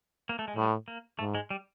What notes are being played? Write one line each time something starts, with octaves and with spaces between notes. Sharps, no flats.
A#3
A3
G#3
A2 G3
A#3
G#2 A3
G#3
G3